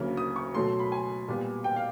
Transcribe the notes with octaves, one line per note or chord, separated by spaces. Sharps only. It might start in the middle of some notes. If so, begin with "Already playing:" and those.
Already playing: D2 C#3 F#3 A#3
D#6
C#6
B2 F#3 A3 C6
B5
G#5
A#2 G3 B3
G5
F5